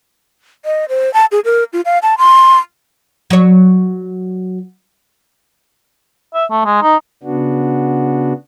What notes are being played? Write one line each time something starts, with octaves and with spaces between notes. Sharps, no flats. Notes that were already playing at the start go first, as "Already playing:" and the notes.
D#5
C5
A5
G#4
A#4
F4
F5
A5
C6
F#3 C#5
E5
A3
G#3
D#4
C#3 B3 D4 F#4